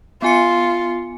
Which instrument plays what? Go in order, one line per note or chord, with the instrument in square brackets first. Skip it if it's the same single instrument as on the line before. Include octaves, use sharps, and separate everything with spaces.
[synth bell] B3 G#5 C#7 [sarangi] F4